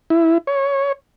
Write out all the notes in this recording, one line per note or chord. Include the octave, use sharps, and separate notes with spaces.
E4
C#5